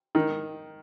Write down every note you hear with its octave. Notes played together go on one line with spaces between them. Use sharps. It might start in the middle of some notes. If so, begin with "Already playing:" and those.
D#3